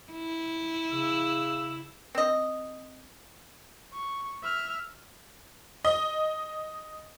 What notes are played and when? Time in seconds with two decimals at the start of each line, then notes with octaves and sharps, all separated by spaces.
0.13 E4
0.92 C#3 E6
2.15 C4 D#5
3.93 C#6
4.43 E5 F6
5.85 D#5